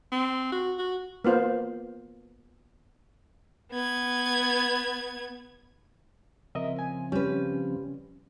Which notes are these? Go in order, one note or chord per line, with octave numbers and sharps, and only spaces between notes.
C4
F#4
F#4
A#3 B3 F4 C5
B3 G#6
C#3 F3 C4 A#4 D#5 E5
G#5
G3 C#4 B4